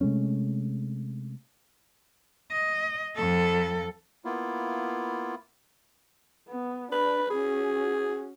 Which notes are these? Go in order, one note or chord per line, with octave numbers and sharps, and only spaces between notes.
C3 G#3 A3 C#4
D#5
F2 A4
A#3 B3 E4 F4
B3
D4 B4 B5
C#4 F#4 G#4